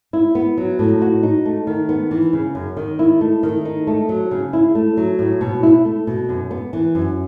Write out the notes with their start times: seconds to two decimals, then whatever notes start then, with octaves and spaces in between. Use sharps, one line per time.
0.13 E4
0.35 B3
0.58 F#3
0.79 A2
1.02 F#4
1.23 D#4
1.46 A3
1.67 D#3
1.89 B3
2.11 E3
2.33 C#3
2.55 F#2
2.77 D#3
2.99 E4
3.21 A3
3.43 D#3
3.65 D#4
3.87 A3
4.09 F#3
4.31 C#3
4.53 E4
4.75 A3
4.97 F#3
5.19 A2
5.41 B2
5.63 E4
5.85 A3
6.07 B2
6.29 F#2
6.51 B3
6.73 E3
6.95 F#2